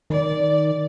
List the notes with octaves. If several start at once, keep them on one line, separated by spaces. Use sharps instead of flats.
D#3 D5